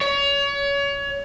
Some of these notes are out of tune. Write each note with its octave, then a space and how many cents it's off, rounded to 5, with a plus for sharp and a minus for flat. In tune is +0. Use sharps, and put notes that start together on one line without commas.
C#5 +25